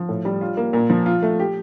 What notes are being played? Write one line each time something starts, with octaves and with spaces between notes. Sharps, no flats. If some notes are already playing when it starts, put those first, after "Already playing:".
Already playing: F3
A2
G3
F4
A#3
A#2
F3
F4
A3
G4